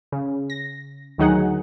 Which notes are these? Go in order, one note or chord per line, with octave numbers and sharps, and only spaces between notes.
C#3
A#6
D2 D#3 F#3 D#4 G#4 F#5